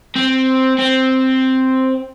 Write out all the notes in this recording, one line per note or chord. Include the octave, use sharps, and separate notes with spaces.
C4
C4